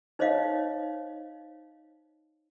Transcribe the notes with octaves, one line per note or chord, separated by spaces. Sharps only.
D#4 C5 C#5 D#5 F5